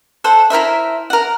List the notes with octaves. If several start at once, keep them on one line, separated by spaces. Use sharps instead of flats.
A4 C5 F#5
E4 A#4 C5 E5
A#4 F#5